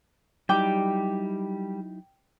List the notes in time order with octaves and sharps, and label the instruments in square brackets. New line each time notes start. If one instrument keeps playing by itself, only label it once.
[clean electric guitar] F#3 D#4 E4 [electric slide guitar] G3 G4 [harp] G5 D6